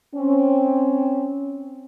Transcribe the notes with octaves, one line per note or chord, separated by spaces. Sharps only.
C4 C#4